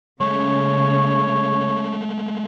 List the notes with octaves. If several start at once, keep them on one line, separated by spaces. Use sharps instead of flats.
C#3 G#3 A3 C#5